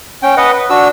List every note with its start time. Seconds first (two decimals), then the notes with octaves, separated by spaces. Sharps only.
0.23 C#4 G5
0.37 B4 D#5 F#5
0.52 B4
0.70 D4 F#4 E6